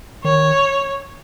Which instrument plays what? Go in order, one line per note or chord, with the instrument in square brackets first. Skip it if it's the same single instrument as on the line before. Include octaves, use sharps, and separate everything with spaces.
[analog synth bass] D#3 [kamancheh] C#5